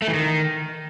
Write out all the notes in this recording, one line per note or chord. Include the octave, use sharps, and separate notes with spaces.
A3
E3
D#3